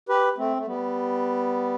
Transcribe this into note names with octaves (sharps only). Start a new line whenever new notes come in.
G4 B4
A3 C4
A3
G3 B3